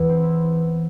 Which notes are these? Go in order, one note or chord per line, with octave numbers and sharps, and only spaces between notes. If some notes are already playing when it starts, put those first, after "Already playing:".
Already playing: E2 E3
C4
E4